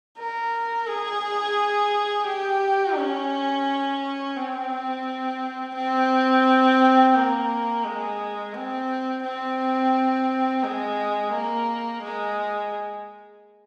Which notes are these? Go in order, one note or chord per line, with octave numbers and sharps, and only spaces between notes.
A#4
G#4
G4
C#4
C4
C4
A#3
G#3
C4
C4
G#3
A#3
G#3